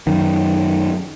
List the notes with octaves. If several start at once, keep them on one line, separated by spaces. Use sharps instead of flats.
F#2 D#3